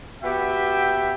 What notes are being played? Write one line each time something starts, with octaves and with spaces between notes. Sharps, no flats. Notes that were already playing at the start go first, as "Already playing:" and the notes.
B3 F#4 G4 E5 G5